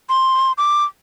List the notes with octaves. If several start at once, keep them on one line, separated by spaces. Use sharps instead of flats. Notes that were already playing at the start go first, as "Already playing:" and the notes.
C6
D6